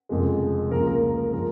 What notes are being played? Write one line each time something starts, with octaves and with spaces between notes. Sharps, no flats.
F1 F2 C#3 G#3
C#2 C#3 F3 A#3 A#4
A#4
A#4
A#4
F3 G#3 A#4